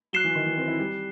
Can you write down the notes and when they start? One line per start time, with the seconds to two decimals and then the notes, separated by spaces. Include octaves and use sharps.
0.13 F#3 F#6 C7 E7 G7
0.24 E3
0.35 D#3
0.46 E3
0.57 C4
0.68 E4
0.79 G3